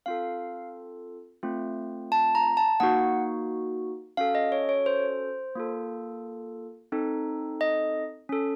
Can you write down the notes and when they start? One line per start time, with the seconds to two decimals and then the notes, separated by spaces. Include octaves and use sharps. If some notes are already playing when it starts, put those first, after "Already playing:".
0.06 C4 F4 A4 F5
1.43 A3 C4 F4
2.12 A5
2.35 A#5
2.57 A5
2.80 A#3 D#4 F#4 F#5
4.17 C#4 F#4 A4 F5
4.35 D#5
4.52 C#5
4.69 C#5
4.86 C5
5.56 A#3 F4 A4
6.92 C4 D#4 A4
7.61 D#5
8.29 C#4 A4